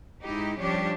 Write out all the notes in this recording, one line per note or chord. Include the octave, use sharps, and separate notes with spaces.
G#2 G#3 D#4 E4 G4
F3 G3 C#4 D4 G4 C#5